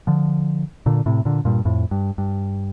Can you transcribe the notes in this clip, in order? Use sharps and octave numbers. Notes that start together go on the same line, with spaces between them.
D3 F3
A#2 D3
A2 C3
A#2 D3
G2 A#2
F2 A2
G2
G2